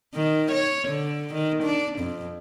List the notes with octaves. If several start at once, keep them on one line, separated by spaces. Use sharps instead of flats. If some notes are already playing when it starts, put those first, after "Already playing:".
D#3
C#5
D3
D#3
D4
F2